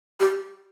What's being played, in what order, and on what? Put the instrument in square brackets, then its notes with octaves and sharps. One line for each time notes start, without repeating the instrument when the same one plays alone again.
[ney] G4